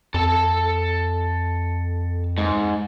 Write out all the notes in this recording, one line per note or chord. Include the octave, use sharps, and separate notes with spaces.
F2 A4 A5
G#2